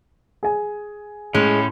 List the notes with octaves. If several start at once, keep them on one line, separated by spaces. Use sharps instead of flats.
G#4 G#5
A2 G#3 C#4